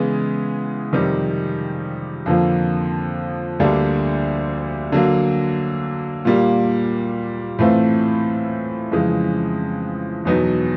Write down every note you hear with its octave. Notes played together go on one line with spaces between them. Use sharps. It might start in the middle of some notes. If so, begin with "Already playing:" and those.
Already playing: C#3 E3 G#3 B3
F2 C3 D#3 G3
F2 D3 F3 A#3
D2 D3 G3 A#3 D4
D3 F#3 A#3
A#2 G3 A#3
A2 E3 A3 C4 F4
F2 C#3 E3 G#3
E2 B2 F#3 B3 D#4